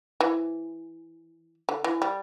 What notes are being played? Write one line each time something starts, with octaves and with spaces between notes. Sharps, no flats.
E3
D3
E3
G3